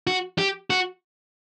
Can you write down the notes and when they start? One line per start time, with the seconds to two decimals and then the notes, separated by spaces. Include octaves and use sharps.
0.07 F#4
0.38 G4
0.70 F#4